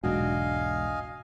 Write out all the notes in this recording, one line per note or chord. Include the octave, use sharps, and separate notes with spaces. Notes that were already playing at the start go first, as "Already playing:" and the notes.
E1 B1 G#2 D4 F#4 D#5 F5 G#5